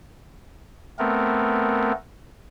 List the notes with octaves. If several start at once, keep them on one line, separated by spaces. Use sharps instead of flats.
A3 B3 C4 A#4